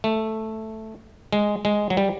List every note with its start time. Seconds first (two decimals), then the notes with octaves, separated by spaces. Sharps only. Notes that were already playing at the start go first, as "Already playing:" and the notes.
0.04 A3
1.33 G#3
1.65 G#3
1.90 F#3
1.97 G3